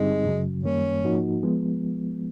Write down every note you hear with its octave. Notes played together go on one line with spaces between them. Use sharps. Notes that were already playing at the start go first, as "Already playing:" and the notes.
Already playing: G2 D3 G3 G#3 C4 D#4
F#2 C#3 F#3
F#2 D#3 G3 A#3 C#4
G#2 F3 A#3 D#4 F#4
F3 G#3 B3